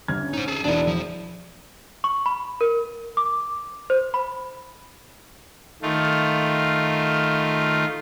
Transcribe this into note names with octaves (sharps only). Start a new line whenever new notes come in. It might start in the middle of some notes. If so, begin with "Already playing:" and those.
G1 F6 G#6
C#4
D#4 C5
G#4 A4
E1 D4 E4 A#4 D5
F3
C#6
B5
A#4
D6
C5
B5
D#3 A3 F4